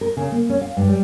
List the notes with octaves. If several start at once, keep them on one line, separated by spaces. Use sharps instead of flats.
A#4
C#3
A#3
C#4
F5
G2
G3